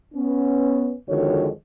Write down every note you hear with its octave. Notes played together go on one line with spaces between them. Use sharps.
B3 C#4
F2 D3 D#3 G#3 F#4 C#5